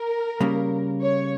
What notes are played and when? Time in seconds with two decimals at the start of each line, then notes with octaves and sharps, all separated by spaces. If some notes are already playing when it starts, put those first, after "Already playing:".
Already playing: A#4
0.40 C#3 G3 A#3
1.00 C#5